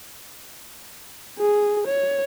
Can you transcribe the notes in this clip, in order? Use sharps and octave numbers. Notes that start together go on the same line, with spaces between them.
G#4
C#5